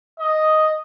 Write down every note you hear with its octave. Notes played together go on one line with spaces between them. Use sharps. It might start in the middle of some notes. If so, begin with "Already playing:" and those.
D#5